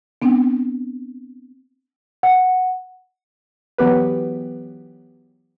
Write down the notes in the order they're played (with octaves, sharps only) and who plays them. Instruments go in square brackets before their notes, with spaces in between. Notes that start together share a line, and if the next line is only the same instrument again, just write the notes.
[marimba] B3 C4 D4
[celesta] F#5
[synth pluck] E3 F#3 B3 G4 B4